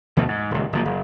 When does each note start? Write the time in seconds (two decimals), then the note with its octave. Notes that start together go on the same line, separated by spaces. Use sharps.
0.17 D2 B2 E3 A3
0.28 G#2
0.51 D#1 C#2
0.73 F#1 F3 A#3
0.85 F#1